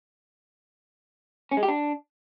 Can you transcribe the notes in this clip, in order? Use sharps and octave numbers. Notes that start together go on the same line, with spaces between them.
C#4
G#3
G4
D4